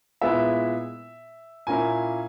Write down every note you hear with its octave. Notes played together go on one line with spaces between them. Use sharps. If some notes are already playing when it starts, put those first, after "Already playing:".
A#2 G#3 B3 E4 E5
A#2 A#3 C#4 E4 G#5